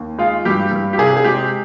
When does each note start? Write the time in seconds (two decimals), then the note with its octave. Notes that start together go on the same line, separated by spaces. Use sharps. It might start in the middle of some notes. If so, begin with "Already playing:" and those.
Already playing: D#2
0.19 G#3 F4
0.45 G2 G4
0.71 G2
0.93 G4
0.98 C3 G#4
1.17 G#4
1.24 G#3 G4